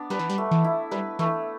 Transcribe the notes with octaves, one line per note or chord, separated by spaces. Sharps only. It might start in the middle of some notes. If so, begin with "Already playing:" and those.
Already playing: B3 D4
G3 B4
E3
G3
A3
E3
E4
G3 B4
E3 A3